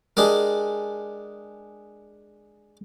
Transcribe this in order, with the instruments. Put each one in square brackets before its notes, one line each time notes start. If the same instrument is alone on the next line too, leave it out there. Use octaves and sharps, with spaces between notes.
[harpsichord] G#3 D4 G4 G#4 A#4